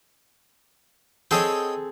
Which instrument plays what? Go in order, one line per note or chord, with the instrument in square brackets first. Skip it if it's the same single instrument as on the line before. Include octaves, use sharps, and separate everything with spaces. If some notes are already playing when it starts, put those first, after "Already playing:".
[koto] C4 G#4 A4 [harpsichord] C#5 D#5 G5